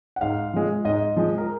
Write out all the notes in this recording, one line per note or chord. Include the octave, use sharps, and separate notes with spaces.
F#5
G#2 F5
F3 G#3
G#2 D#5
F3 G#3
A#4